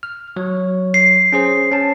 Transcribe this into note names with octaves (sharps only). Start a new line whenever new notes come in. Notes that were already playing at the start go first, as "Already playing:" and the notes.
F6
F#3 C#5
C7
C#4 G#4 C5
C#4 A5